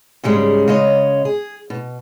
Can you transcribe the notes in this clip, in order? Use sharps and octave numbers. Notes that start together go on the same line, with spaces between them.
G#2 C#3 G3 G#3 C#4
C#3 G#3 C#5 D#5
G#4
B2